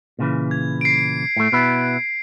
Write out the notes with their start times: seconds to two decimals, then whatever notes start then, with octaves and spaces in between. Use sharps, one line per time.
0.19 A#2 C#3 E3
0.51 G#6
0.81 C7 D7
1.37 A2 A3
1.52 B2 B3 E4